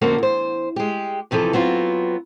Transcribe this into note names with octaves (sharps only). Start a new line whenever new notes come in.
F2 D3 A#3 C#4 F#4 C5
E2 C5
G#3 G4
E2 C3 E3 F3 A4
F#3 B3 C4 F4